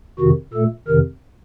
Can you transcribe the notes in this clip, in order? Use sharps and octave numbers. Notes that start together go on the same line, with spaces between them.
F2 C3 D#3 F#4
A#2 A3 A4
F2 C3 D#3 A#4